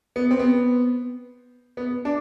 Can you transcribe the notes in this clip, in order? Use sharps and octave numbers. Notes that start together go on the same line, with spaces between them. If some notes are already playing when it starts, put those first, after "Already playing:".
B3
C4
B3
B3
D4